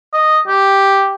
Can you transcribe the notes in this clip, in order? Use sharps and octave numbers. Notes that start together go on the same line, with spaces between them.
D#5
G4